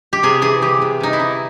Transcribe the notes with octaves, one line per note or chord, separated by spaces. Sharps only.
G4
C3 G#4
E3 G#4
E3 G4
C3
C3 D#4
E4
E3